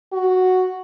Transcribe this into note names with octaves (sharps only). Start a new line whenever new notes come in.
F#4